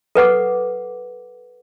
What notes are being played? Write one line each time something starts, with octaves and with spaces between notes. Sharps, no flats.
A4 B4 F#5 D6